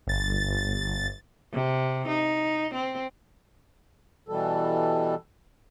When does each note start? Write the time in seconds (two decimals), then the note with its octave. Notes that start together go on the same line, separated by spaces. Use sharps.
0.07 G1 A6
1.53 C3
2.08 D#4
2.74 C4
4.29 B2 E3 G3 A4